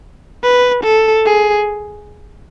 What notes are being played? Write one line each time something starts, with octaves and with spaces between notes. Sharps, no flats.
B4
A4
G#4